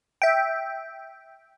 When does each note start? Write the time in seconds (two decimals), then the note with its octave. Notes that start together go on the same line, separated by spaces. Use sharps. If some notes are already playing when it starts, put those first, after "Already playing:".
0.22 E5 G5